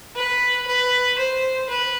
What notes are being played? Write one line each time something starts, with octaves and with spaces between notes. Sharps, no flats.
B4
B4
C5
B4